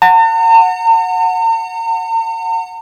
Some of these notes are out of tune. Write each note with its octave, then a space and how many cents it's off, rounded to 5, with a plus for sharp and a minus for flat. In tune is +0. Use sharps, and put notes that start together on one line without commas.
F#5 -10 A#5 -45